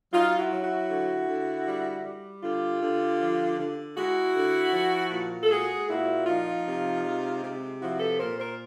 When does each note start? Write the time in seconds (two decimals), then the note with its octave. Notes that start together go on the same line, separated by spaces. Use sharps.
0.11 F#3 D#4 F4
0.37 E4 F#4
0.50 F#3
0.62 E4 F#4
0.88 D3
1.27 D3
1.65 G3
2.04 G3
2.42 D3 F4 G4
2.81 D3
3.19 F3
3.57 D3
3.96 G#3 E4 F#4
4.34 D3
4.72 F3
5.11 A#2
5.41 A4
5.50 G#3 F#4 G#4
5.88 A#2 E4 F#4
6.26 F3 D#4 F4
6.65 C3
7.04 G#3
7.42 C3
7.80 F3 E4 F#4
7.99 A4 B4
8.18 A#2 A#4 C5
8.37 A#4 C5